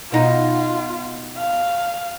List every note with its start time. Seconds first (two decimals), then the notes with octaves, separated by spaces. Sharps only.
0.12 B2 D#4 F4
1.37 F5